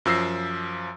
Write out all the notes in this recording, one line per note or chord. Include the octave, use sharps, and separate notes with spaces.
F#2 F3 E6 A#6 C7